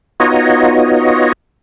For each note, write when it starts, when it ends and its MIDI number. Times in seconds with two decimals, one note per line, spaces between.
0.20 1.32 59
0.20 1.32 63
0.20 1.32 65
0.20 1.32 66
0.20 1.32 73
0.20 1.32 75